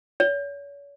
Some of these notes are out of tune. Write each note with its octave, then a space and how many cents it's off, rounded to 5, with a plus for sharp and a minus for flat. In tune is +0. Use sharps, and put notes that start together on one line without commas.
C#5 +40